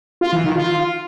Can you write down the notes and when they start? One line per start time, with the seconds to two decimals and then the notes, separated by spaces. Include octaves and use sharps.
0.21 F4
0.33 E3
0.44 D#3
0.56 F4